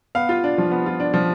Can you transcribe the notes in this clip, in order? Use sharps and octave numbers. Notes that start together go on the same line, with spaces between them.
B3 F5
F4
D4
F3
B3
F4
D4
F3